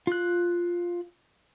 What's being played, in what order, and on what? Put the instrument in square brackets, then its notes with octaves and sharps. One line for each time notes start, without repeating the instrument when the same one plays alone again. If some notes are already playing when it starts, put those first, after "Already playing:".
[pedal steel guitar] F4 F#6